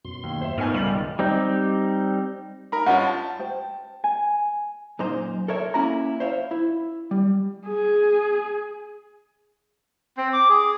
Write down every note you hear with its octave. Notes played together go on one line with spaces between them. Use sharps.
F#2 B2 C6
D#2
C5 E5
G#2 A3 B3 D#4 F4 A#4 G#5
C#2 G3 F#7
B2 D#3
G3 C4 D#4
D#4 A#4 G#5 A#5 B5
G2 C#4 F4 D#5 F#5
A5
C5 G5
G#5
F#2 A#2 D#4 C5
A4 A#4 C#5 E5
A#3 C#4 E4 F#4 A#5
C5 C#5 E5 F5
E4
G3
G#4
C4
D6
G#4